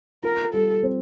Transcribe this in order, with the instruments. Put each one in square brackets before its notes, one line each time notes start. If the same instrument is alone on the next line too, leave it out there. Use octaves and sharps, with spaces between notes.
[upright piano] F4 [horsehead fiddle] A#4
[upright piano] G3 [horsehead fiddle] A4
[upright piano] C4